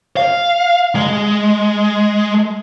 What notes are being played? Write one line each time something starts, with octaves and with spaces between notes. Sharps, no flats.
F5
G#3